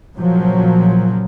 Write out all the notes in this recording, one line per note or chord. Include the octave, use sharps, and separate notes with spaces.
A#2 C#3 F3 F#3